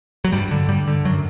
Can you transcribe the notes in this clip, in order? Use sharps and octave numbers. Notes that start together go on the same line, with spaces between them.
F#3
G2 G3
D3
G2 G3
D3
F#2 F#3